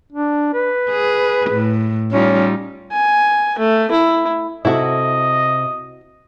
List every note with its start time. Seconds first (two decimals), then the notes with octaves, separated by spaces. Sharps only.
0.13 D4
0.54 B4
0.90 G#4
1.51 A2
2.13 G3 C#4 D#4 F4
2.92 G#5
3.59 A3
3.91 E4
4.65 C3 E4 F#4 A4 D#5